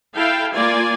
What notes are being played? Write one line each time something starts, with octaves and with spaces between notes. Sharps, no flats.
E4 A4 F5 G5
A#3 F4 D5 G#5